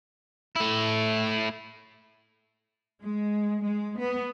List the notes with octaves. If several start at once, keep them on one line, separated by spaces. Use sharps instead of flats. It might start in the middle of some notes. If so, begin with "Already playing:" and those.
A3 E4
G#3
G#3
B3